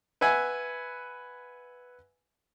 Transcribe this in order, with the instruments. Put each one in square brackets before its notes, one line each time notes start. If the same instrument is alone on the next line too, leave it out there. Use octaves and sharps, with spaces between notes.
[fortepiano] B4 E5 F#5 G#5